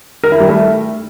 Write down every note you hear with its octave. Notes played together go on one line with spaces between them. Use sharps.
A#4
E4
G3
A3